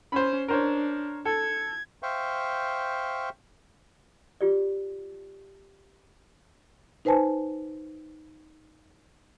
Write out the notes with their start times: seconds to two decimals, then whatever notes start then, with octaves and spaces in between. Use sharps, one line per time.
0.12 C#4 C5 B5
0.48 D4 A#4 C5 C#5
1.25 A4 G#6
2.03 C5 E5 F5 G5 C#6
4.41 F4 G4 D5
7.05 D#4 B4 C5 G#5 A5